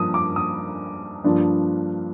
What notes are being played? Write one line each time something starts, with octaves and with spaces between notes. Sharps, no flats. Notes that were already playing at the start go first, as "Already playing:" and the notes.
Already playing: G2 F3 A#3 D#6
D6
D#6
G2 F3 A#3 D4 F4